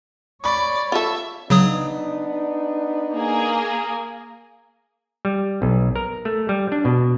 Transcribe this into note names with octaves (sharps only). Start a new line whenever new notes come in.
C#5 D5 B5 C#6
F4 A4 E5
C#3 F#3 B3 D4 D#4 D#6
A#3 G#4
G3
B1
A#4
A3
G3
D4
B2